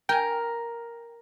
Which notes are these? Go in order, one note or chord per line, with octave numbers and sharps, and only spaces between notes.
A#4 G5 G#5